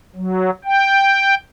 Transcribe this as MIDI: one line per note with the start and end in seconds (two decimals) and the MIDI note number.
0.16 0.50 54
0.65 1.35 79